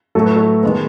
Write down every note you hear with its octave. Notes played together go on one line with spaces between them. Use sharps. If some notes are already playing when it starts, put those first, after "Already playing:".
A2 F#3 A3 A4
B4
F#4 A4
D#3 G#3 B3